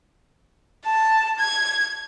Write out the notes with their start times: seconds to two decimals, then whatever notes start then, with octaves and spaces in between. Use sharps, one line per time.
0.85 A5
1.39 G#6